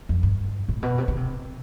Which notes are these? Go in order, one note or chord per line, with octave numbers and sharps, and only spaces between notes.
F2
G2
A2
B2
C3
D3
C3